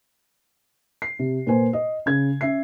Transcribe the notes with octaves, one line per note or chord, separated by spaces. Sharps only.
C7
C3
A#2 B4 C5 G#5
D#5
C#3 G#6
C#4 E5 C7